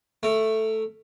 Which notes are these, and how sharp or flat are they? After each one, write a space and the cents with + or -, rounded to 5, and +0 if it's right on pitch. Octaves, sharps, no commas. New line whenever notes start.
A3 +0 A#4 -20